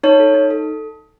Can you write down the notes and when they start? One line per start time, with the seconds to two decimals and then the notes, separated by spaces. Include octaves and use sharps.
0.03 D#4 C#5
0.20 A4
0.34 D#4
0.51 A4